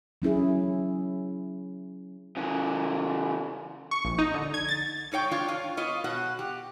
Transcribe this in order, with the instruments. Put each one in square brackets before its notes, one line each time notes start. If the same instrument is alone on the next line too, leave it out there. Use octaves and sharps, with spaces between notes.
[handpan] F#3 C#4 E4 G#4
[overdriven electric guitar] C#3 E3
[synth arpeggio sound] C#6
A#1
D#4
D3
G#6
A6
[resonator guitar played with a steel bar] G#2 D#4 C#5 G5
D4 F4 C#5
F4
B3 F4 C#5 D#5
B2 F#4 F#5
G4